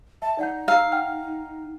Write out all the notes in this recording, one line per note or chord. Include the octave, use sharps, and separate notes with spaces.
E5 A5
D#4 D5 F#5 G6
F5 A#5 E6
F#5 G5 F6